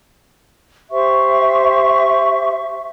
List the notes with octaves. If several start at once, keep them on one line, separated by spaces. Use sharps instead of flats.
G4 C5 E5 C#6